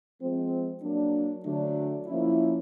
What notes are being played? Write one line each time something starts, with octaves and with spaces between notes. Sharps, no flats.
F3 G#3 C4
F#3 A#3 D4
D3 F#3 A3 D4
F3 A#3 C#4 E4